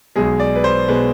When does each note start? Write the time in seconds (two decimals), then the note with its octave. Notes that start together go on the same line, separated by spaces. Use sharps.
0.16 B1 B2 G#3 G#4
0.40 D5
0.56 B4
0.64 C5
0.88 B2 G#3 B4